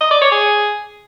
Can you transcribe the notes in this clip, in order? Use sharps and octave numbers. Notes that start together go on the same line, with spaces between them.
D#5
D5
C#5
G#4